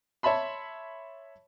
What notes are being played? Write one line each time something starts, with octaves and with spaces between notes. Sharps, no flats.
C#5 E5 A5 B5 C6